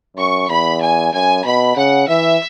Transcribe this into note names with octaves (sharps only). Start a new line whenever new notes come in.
F#2 C#6
E2 B5
G#5
F#2 G#5
B2 B5
C#3 F#5
E3 E5